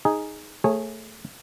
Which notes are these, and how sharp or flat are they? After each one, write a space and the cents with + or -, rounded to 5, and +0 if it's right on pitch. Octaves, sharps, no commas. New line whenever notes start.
D#4 +0 G#4 +0
A3 +15 G#4 +0 C#5 -25